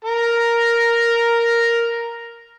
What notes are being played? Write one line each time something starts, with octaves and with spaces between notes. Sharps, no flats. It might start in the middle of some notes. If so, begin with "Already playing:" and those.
A#4 A#5